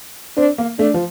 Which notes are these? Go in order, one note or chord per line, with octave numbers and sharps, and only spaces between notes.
C4 D4
A#3
A3 D4
F3